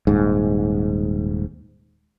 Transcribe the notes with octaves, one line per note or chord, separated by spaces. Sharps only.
D#1 G#2